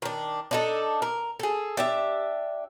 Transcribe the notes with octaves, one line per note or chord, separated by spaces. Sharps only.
D#3 D4
D4 D#4 A4
A#4
G#4 A4
D4 G4 E5